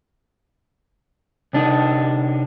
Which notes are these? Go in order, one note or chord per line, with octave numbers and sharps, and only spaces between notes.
C3 D4 D#4